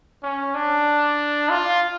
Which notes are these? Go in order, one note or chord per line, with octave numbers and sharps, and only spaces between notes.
C#4
D4
F4